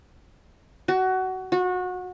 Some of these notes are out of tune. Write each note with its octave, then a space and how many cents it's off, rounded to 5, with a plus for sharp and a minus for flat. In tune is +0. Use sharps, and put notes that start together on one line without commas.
F#4 +20
F#4 -25